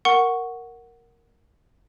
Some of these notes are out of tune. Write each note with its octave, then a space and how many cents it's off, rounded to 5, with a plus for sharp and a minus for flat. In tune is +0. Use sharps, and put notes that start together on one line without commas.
A#4 +0 F#5 +0 C#6 +0